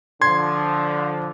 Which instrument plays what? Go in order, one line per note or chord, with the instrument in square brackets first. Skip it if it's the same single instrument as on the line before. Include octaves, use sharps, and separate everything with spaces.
[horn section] D3 F3 [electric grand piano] C6 G#6